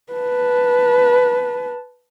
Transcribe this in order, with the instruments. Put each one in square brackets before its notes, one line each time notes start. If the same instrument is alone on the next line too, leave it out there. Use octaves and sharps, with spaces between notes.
[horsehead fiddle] B4 A5